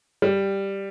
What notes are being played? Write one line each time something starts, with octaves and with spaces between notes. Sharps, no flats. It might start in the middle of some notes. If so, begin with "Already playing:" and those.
G3